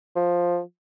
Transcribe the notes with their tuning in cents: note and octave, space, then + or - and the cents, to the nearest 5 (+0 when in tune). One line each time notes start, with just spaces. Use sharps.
F3 +5